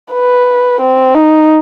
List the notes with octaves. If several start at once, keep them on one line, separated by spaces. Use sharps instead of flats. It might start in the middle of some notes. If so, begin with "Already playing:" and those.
B4
C4
D#4